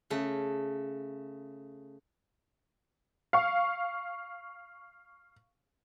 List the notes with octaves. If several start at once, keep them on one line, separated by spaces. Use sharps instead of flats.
C#3 A3
F5 C#6